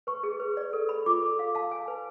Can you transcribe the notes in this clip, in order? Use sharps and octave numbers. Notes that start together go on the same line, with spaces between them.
B4 C#6
G#4
B4
D5
A4
B5
F4 D6
A4
F5
F5 A5
G#5
B4